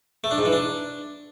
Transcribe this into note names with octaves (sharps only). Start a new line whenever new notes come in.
A3
D4
G#2
E3
D4